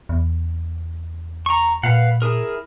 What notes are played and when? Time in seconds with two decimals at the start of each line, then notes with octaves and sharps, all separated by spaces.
0.09 E2
1.46 A#5 C#6
1.83 A#2 B4 F5 F#5
2.22 E4 G#4 A#4